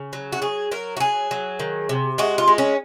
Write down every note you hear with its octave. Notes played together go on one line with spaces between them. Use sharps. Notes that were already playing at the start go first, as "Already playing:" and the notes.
Already playing: C#3
F#3
F#4
F#3 G#4
F#3 A#4
F#4
F#3 G#4
F#3
D#3
C3
G#3 F#4
F4
G#3
C#4